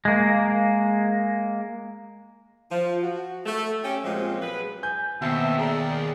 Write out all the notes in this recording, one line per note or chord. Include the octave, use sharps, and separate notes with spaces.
G#3 A#3
F3
F#4
A3
C#4 G4
A#2 F3 F#3 G#3 C4
F#3 G#4 B4
G#5 G6
D#2 B2 A3 B3 C4 E5 A5
G#4 D5 A#5